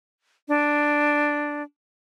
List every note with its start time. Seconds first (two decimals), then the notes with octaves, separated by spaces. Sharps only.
0.48 D4